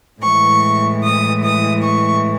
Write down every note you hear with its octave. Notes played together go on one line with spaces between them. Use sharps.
A2 E3 G#3 C#6
D#6
D#6
C#6